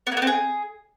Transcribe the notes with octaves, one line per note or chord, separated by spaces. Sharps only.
B3
A#3
B3
C4
G#4